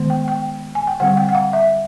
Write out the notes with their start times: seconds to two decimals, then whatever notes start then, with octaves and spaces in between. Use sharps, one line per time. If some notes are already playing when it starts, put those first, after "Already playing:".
Already playing: D#3 G#3 B3
0.10 G5
0.28 G5
0.75 G#5
0.87 G5
1.00 D3 G3 C4 F#5
1.17 G5
1.29 F#5
1.35 F5
1.53 E5